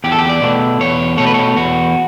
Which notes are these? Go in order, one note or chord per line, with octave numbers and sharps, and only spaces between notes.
E2 G4
A4
G4
D5
B2 A3
E2 C#5
B2 A3 C#5
B4
C#5
E2 F#4